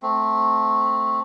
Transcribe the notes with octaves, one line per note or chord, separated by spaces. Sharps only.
A3 C4